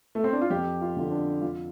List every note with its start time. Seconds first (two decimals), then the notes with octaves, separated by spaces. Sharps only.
0.15 A3
0.24 C4
0.33 D4
0.41 F4
0.50 F2 G4
0.81 F4
0.97 D3 F4
1.11 D4
1.42 F2 F4